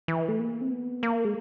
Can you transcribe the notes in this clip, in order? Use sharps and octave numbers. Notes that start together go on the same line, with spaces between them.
E3
A3
A#3
C4
B3
A#3
G#3